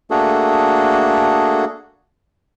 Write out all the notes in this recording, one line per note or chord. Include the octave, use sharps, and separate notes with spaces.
A3 A#3 D4 F#4 G#4 A4